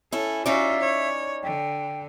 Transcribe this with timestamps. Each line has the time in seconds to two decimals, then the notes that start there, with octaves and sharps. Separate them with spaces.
0.12 C#4 E4 A4
0.46 C#4 D#4 F4 F#4 D5 E5
0.80 C#5
1.43 D3 G5